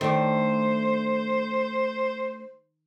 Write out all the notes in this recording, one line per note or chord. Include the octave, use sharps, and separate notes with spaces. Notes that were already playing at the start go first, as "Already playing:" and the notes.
D#3 A3 D4 C5